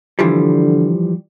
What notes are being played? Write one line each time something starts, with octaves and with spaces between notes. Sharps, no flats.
D3 E3 F3 G3